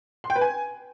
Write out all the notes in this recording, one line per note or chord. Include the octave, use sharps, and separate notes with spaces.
C6
G5
B4
G#5